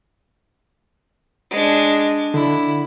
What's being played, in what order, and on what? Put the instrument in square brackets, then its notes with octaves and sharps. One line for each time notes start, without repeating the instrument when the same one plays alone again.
[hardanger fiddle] G#3 D4
[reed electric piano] D3 [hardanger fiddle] E4